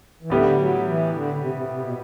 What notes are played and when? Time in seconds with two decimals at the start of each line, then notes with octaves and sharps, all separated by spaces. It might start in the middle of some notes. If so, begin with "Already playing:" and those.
0.23 E3
0.30 A2 D3 G3 B3 E4 G4
0.57 F#3
0.85 E3
1.12 D3
1.33 D3
1.39 C3
1.54 C3
1.68 C3
1.81 B2